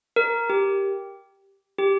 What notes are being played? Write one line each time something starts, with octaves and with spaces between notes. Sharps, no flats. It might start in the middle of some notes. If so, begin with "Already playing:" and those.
A#4
G4
G4